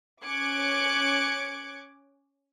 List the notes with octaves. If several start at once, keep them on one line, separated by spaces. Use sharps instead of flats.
C#4 D6 F#6 G#6 C#7 D7